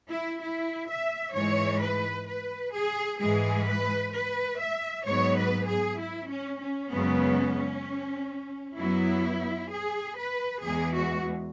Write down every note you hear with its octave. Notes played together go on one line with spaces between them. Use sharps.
E4
E4
E5
G#2 E3 G#3 C#5
B4
B4
G#4
G#2 E3 G#3 G#4
B4
B4
E5
G#2 F#3 B3 C#5
B4
G#4
E4
C#4
C#4
F#2 C#3 G#3 B3
F#2 F#3 B3 E4
G#4
B4
E2 E3 G#3 G#4
F#4